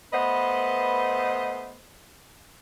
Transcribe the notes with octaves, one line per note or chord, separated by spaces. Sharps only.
A3 B3 B4 C5 D#5